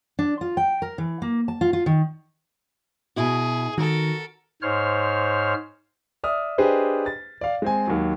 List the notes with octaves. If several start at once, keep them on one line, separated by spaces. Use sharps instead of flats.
D4
F4
G5
A#4
E3
A#3
A5
F4
F4
D#3
B2 E4 F#4 G#4
D#3 F#4 A4 A#4
G#2 C5 C#5 F6
D5 E5 D#6 F6
D4 G4 G#4 B4 C5 D#5
A6
D5 F5
G#3 C4 G#5
D#2 F#3